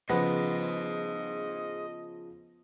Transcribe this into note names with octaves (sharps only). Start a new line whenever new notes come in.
C#3 F3 B3 G#4 C5 D#5 A#6